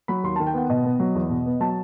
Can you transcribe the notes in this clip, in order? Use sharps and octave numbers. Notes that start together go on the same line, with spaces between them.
F#3 B5
D#2 C6
D#3 A5
G5
B3 F#5
B2 D#5
B3
F#3
E2
B2
B3
F#3 A5